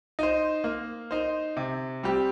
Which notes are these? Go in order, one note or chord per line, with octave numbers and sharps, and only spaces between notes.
D#4 C5
A#3
D#4 C5
C3
G3 C4 G4